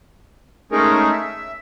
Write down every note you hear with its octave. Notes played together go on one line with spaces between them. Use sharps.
G#3 A3 C#4 D#4 G#4 A#4
E5